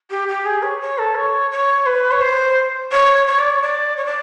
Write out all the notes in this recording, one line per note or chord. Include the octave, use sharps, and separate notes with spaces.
G4
G4
G#4
C#5
C#5
A4
C#5
C#5
B4
C#5
C5
C#5
C#5
D5
C#5
D5
C#5
D5